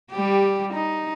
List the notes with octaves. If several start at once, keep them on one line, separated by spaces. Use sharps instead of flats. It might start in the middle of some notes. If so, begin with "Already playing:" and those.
G3 G4
D#4